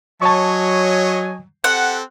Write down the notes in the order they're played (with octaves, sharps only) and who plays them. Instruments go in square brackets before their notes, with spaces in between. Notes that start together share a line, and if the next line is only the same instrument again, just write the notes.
[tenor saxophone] F#3 [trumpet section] C#5 D#5 G#5 [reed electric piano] A5 C#6
[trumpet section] C4 G4 A4 [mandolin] F#5